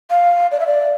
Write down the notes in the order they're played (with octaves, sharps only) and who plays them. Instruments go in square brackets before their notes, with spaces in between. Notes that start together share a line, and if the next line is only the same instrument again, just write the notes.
[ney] F5
D5
E5
D5